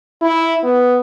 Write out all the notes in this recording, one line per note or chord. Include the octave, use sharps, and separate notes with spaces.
E4
B3